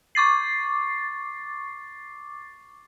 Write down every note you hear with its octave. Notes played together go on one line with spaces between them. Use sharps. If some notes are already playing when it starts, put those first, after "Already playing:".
C#6 D6 A6 C7